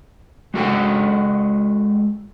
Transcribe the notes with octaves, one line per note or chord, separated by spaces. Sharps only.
G#3 F#4 A4 G5